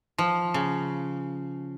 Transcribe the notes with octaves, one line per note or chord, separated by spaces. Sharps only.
F3
C#3